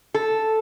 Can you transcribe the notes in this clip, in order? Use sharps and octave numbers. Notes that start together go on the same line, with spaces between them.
A4